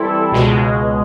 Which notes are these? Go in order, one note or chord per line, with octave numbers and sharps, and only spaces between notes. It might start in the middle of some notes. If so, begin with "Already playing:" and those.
Already playing: E3 G3 C4 E4 A4
C#2 B2 G#3